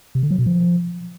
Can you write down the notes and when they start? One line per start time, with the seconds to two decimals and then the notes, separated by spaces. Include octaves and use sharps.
0.15 C3
0.23 D3
0.31 F#3
0.38 B2
0.46 F3